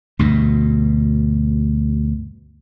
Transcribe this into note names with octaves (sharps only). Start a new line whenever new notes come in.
D2 G2 B2